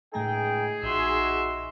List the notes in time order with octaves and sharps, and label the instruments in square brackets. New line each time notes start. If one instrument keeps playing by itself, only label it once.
[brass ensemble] C#2 D#4 G5 [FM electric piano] A2 A3 A#5 [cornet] G#4
[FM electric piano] A#1 [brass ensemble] D#4 F#4 [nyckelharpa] E5 C6